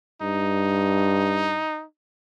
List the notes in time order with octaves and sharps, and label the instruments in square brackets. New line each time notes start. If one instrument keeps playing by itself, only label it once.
[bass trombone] G2 [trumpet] D#4